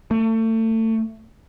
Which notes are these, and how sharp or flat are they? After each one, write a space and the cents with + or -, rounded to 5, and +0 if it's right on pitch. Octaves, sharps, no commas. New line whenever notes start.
A3 +30